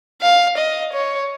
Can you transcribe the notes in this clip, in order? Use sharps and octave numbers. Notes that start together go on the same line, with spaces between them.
F5
D#5
C#5